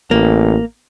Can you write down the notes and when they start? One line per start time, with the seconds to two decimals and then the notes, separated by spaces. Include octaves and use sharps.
0.11 A1 A#3